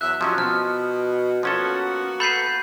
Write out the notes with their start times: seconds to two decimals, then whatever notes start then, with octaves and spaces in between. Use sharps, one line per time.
0.01 E2 F#3 E5 F#6
0.21 C3 F3 F#3 C#4 D#4 F#4
0.38 B2 F3 F6
1.43 F3 A#3 B3 C#4 F#4 A4
2.20 A4 B4 B5 G6 C7